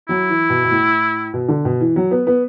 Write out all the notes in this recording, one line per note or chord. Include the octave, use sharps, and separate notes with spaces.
F#3 E4
E3
B2
B2
A2
B2
D3
B2
E3
F#3
B3
B3